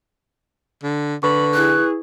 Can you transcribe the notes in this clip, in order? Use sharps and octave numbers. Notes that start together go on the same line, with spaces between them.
D3
D3 B4 B5 C#6
E4 G#4 F#6